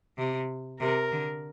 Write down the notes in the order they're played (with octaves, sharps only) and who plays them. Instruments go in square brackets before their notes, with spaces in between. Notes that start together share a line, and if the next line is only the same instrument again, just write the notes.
[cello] C3
[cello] C3 [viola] A#4
[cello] D3